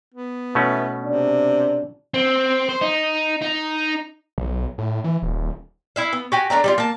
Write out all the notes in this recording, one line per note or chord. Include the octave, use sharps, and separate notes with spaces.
B3
B2 E3 A3 C#4
C3 D4
C4
C5
D#4
D#4
B1
A2
E3
D#1
E4 E5 F5
B3
F#4 G4 G#5
A3 D4 F5 A#5
G3 D#4 F4
A#3 A5